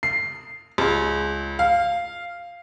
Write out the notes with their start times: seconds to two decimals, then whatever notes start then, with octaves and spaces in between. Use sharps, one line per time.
0.03 C7
0.78 C#2
1.59 F5